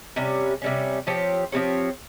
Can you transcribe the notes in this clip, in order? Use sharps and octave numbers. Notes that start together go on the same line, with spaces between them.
C3 G3 C#4
C3 G3 C#4
F3 C4 G4 C#5
F3 C4 G4 C#5